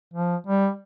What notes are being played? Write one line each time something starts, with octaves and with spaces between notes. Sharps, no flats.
F3
G3